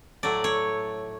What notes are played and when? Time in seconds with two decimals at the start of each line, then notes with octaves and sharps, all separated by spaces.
0.23 A2 F#3 A3 D5
0.44 C#5